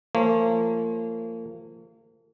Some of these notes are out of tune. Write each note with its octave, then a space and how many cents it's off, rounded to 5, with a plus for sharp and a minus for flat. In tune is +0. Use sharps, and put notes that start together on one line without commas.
F3 -30 A#3 -40 C#5 -35